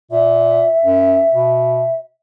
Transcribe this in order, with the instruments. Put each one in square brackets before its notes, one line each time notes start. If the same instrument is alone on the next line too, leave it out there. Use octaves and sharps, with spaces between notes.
[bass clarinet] A#2 [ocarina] E5
[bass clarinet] F#2
B2